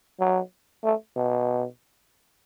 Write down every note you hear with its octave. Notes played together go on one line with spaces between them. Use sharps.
F#3
A3
B2